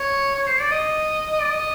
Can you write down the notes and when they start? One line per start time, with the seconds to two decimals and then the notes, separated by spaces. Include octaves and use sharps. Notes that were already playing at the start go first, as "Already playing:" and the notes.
Already playing: C#5
0.35 C#5
0.47 C5
0.60 D5
0.71 D#5
1.32 D#5
1.40 D5
1.49 D#5